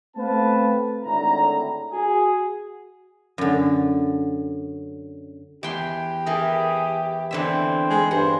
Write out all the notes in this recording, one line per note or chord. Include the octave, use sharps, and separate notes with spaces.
A3 B3 C4 B4 F5 A5
G#1 A2 D3 E4 A#5
F#4 G#4
F#2 D3
E2 G4 G5 C6
E3 G#4 A#4
E2 D3 C4 E5
G#3
G2 C5 F#5